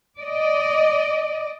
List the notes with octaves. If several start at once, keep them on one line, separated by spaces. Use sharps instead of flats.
D5 D#5